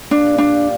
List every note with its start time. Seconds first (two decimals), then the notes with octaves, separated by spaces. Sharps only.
0.11 A#2 A#3 D4 G4 D5 F5
0.38 D4